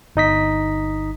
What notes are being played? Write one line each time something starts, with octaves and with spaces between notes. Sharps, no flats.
G1 D#4 D#5 B6